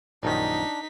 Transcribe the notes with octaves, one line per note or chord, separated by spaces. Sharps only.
A#1 F#2 D#3 D4 D#4 B6